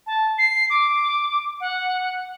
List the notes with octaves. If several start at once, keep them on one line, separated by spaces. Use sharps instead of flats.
A5
C7
D6
F#5